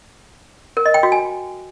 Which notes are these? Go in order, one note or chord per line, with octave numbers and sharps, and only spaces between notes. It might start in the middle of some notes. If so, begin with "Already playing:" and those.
A#4
D#5
G5
F#4
G#5